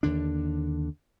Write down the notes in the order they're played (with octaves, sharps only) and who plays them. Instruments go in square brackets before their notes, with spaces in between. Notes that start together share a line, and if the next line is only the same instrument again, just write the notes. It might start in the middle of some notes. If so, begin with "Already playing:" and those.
[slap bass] D#2 D3 D4